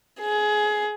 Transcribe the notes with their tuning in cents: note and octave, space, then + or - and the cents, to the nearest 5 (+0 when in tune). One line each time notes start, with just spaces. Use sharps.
G#4 +20